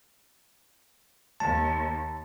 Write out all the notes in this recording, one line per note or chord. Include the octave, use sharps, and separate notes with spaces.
D#2 A5